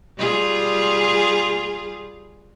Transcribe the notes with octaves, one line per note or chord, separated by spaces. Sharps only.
G3 F4 G#4